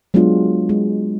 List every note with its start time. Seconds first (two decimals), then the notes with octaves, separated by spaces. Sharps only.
0.14 F#3 G#3 B3 D4 F4
0.69 G#3